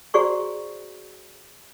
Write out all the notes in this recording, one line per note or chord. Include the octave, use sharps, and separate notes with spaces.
F#4 G#4 C5 D5 A#5 C#6